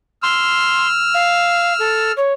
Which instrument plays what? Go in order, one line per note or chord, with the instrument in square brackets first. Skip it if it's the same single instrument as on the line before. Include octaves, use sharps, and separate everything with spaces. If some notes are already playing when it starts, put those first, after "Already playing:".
[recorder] C6 [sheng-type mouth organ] E6 F6
[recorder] F5
A4
C#5